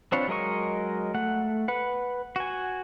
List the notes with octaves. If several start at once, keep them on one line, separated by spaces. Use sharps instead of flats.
C4 D4 F4 B4 C#5
F#3 G#3 A#4 D#5 C#6
A3 F#5
B4 F#5
F#4 G#5